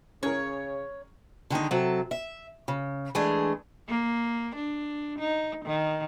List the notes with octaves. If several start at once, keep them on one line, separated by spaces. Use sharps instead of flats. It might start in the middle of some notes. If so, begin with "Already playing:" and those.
C#3 C#4 G#4 A#4 C#5
D3 D#3 G#3 D#4
C3 F#3 A4
E5
C#3
E3 G#3 A3 D4 G#4
A#3
D4
D#4
D#3